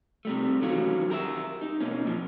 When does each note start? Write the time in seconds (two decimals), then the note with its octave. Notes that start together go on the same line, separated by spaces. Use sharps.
0.25 C3 G3 A3
0.62 D#3 E3 F#3 C#4 F4 F#4
1.10 G4 A#4 C5 E5
1.61 D#4
1.80 B2 A#3 C#4
2.05 A#2 F3